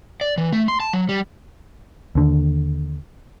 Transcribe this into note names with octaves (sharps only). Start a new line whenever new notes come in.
D5
E3
A3
C6
A5
F#3
G3
D#2 D3